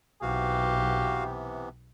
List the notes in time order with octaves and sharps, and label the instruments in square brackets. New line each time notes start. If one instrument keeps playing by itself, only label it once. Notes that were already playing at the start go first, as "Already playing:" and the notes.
[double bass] B1 [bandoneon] C3 E3 B3 [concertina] F#4 F5 [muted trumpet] G4